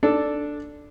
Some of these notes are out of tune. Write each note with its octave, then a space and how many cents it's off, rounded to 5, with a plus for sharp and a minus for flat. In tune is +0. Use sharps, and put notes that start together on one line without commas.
D4 +0 A4 +0